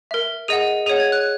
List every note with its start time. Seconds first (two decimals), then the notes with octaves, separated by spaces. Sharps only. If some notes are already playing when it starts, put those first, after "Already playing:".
0.11 A#4 E5
0.48 G#4 D#5 F#5 D#7
0.86 G#4 C#5 F#5 D#7
1.00 G#6
1.12 F#6